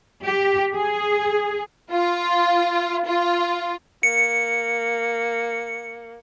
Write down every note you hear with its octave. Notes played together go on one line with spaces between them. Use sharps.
G4
G#4
F4
F4
A#3 C#7